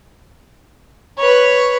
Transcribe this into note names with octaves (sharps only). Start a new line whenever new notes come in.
B4 C#5